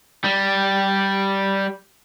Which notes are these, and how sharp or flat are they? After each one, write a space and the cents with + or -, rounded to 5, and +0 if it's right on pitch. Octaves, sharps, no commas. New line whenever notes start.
G3 -5